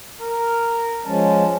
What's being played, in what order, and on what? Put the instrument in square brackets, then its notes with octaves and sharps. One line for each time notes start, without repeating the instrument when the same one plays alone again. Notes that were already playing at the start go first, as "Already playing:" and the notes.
[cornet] A#4
[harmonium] F3 G#3 C#4 [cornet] A5